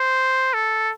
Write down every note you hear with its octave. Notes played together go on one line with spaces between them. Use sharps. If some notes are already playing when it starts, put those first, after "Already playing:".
Already playing: C5
A4